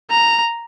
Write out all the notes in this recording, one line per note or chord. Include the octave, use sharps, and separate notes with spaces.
A#5